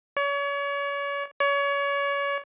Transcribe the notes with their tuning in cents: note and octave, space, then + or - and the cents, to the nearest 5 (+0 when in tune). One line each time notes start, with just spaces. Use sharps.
C#5 +35
C#5 +30